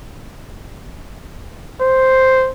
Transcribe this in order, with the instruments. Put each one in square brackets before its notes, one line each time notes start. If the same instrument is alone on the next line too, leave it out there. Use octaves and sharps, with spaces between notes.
[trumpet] C5